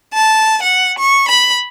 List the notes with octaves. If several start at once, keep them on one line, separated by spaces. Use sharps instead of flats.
A5
F#5
C#6
B5